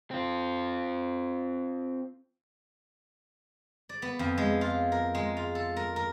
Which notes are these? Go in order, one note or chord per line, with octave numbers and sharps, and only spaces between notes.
C4 F4
D5
B3
F2
G#3
F4
A#4
G#3
F4
A4
A#4
A#4